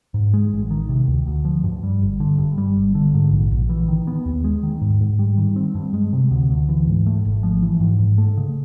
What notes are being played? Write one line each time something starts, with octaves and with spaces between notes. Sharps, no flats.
G#2
G#3
A1
D#3
C3
D2
D2
F3
G2
G3
G1
D3
G2
G3
G1
D3
G#2
A#1
A#1
E3
D#3
B3
D#2
G#3
D#3
G#2
G#2
G3
D#3
C4
G2
G#3
C3
D2
D2
E3
G#2
A3
G#1
F3
E3
G#2
G#2
A3
C#3